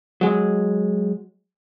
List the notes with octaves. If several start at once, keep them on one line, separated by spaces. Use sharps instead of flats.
F#3 G#3